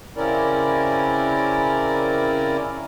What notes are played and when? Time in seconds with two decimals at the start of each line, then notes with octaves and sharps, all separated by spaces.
0.17 C#3 C4 C#4 E4 A#4 D5